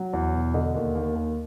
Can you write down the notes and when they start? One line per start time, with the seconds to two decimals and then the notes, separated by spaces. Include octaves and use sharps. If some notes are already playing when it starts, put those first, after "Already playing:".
Already playing: F#3
0.13 E2
0.34 B2
0.54 D3 D#5
0.75 D#2
0.95 D#2
1.15 D#2